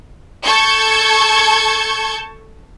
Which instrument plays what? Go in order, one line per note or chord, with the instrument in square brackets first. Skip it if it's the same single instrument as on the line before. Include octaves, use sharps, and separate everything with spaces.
[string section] A4 A5 C#6 G6 G#6